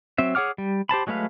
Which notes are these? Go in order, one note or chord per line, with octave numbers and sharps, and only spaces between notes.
F#3 C4 E5
G#4 C#5 F#5 D6 F6
G3
G4 C5 A5 B5
F#3 G#3 A3 B4 F5